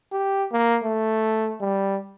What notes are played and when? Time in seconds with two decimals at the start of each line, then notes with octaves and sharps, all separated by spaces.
0.12 G4
0.52 A#3
0.84 A3
1.61 G3